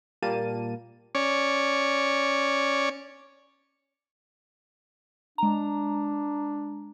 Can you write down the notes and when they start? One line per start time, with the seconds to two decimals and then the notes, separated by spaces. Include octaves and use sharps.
0.22 A#2 G3 A#3 A5 D#7
1.15 C#4 C#5 D5
5.38 G#3 D4 A#5